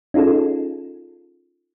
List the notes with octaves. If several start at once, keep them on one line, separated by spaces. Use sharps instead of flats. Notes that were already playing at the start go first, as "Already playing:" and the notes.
C#4 D#4 F4 G#4 A4